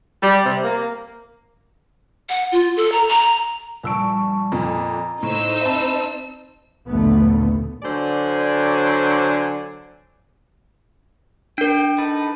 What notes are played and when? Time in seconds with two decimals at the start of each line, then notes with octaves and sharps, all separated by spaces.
0.23 G3
0.44 C3
0.63 A#3
2.29 F#5
2.52 F4
2.77 A4
2.92 A#5
3.09 A#5
3.83 A#1 G3 A5 C#6 E6 D7
4.52 F2 A#2 A#5
5.23 A2 D#4 C5 E6
5.61 C4 E5 A5 B5
6.88 A#1 D#2 B2 D3 A3 B3
7.83 D3 F#3 C5 D5 G#5
11.58 D4 A#4 G5
11.98 D#4 A4 B4